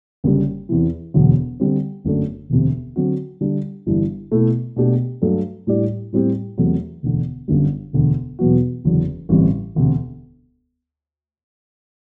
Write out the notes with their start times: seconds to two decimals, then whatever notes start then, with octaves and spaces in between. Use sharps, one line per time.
0.24 F#1 F#2 D3 G3
0.69 E2 C3 E3
1.14 E1 D2 D3 F#3
1.60 D3 G3 C4
2.05 G1 F#2 F#3 A3 D4
2.50 E1 D2 C3
2.96 D3 F#3 C4 F#4
3.41 D3 G3 D4
3.86 G1 G2 E3 G3 D4
4.32 B2 A3 E4
4.76 B2 A3 D4 G4
5.22 G2 F#3 A3 D4 A4
5.67 A2 G3 D4 G4 D5
6.13 A2 G3 C4 G4
6.58 E2 C3 F#3 A3
7.03 E1 D2 D3
7.48 G1 F#2 D3 G3
7.93 E1 D2 D3
8.39 E2 B2 F#3 B3 F#4
8.84 F#1 E2 D3 F#3
9.29 A1 G2 D3 G3 C4
9.75 E1 D2 C3